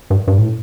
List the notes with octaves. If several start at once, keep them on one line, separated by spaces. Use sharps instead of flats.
G2
G2
A2